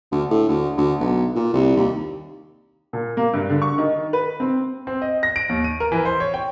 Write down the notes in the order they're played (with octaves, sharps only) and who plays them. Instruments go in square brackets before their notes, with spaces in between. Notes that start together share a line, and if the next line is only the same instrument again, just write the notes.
[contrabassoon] D2
A2
D2
D2
B1
A#2
C2
D#2
[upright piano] A#2
A#3
G2
D3
C#6
D#3
B4
C4
[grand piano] C4
D#5
A#6
D7
D#2
D#7
A#4
E3
C5
C#5
G5